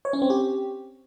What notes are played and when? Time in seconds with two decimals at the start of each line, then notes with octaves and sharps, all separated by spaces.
0.05 C#5
0.13 C#4
0.22 C4
0.30 G4